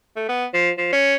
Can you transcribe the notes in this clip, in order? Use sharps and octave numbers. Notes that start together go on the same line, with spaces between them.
A3
B3
F3
F3
C#4